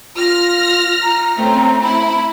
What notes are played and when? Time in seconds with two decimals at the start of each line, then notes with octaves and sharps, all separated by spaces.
0.16 F4 F6 A#6
1.03 A#5
1.37 A3 C4 C#4
1.82 E4 B5